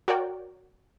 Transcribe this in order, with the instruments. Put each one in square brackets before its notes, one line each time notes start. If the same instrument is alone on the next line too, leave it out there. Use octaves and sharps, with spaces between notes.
[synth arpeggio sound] F#4 A#4 C#5 D5 G5